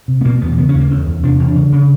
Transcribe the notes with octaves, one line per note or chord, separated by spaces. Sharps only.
C3
B3
B2 A#3
E2 B3
A#3
C#3 B3
C#4
D#2
A#3
E2 C#4
E2
C3 D4
E2
D4
C#3
C#3